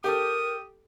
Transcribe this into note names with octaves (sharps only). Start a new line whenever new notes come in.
G4 A4 A#4 D#6